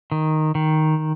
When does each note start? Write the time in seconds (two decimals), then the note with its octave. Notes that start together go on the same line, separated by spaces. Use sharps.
0.12 D#3
0.55 D#3